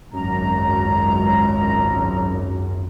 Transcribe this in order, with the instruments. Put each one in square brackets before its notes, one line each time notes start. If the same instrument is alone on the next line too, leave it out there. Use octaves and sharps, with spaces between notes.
[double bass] G#1 C#2 [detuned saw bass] F#2 [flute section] A#5